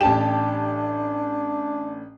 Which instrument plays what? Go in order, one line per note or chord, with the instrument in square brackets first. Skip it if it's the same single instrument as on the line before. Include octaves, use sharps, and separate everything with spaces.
[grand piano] A1 E7 [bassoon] D4 [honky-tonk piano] G4 A5